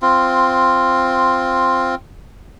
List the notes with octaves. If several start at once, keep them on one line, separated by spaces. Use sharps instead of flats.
C4 F4